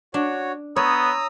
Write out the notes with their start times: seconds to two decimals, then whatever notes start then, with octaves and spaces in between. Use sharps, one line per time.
0.14 D4 F#4 C#5
0.76 B3 C#5 A#5 D#6 E6